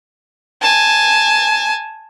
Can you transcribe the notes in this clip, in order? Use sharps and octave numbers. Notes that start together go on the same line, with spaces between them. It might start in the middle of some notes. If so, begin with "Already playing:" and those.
G#5 A5